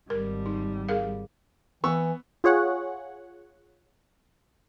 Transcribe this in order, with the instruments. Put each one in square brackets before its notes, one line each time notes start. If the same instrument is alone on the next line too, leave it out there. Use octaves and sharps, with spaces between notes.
[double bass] G#1 G3 [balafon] A#4
[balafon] D#4
G#4 A#4 F5
[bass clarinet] E3 [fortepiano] B3 C#6 E6
[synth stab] F4 G#4 C#5 F#5